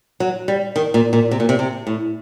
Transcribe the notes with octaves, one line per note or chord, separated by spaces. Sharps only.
F#3
G3
D#3
A#2
A#2
C3
A#2
C3
C3
A2